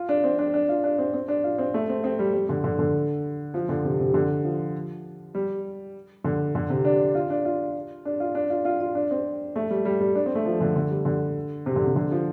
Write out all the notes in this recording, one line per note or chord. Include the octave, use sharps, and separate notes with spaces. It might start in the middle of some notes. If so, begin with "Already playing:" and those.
Already playing: F4
D4
C4
D4
D4
F4
D4
C4
C4
D4
F4
C4
A3
C4
C4
G3
G3
D3
D3
D3
F3
D3
C3
C3
D3
F3
G3
D3
D3
C3
D4
F4
D4
F4
D4
F4
D4
F4
F4
F4
D4
C4
A3
G3
G3
G3
D4
C4
A3
F3
D3
D3
G3
D3
C3
D3
C3
D3
F3